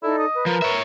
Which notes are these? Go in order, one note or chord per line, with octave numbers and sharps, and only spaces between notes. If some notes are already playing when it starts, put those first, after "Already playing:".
D#4 E4 A4 D5
D#5
B4
F3 A#4
C#5 E5